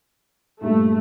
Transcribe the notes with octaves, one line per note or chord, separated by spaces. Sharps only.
G2 A#2 A3